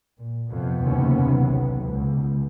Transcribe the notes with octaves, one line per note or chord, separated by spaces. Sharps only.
A#2
F2 C3 B3
F#1 D#2 C#4
B1
C#2